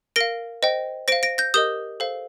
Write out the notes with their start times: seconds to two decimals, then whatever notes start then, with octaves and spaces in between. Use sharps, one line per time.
0.16 A#4 F5 A#6 D7
0.63 C5 D#5 G5
1.08 C5 F5 A#6 D7
1.23 A#6 D7
1.38 G6 A#6
1.54 G4 A#4 D#5 D#6 G6
2.00 A4 C5 F5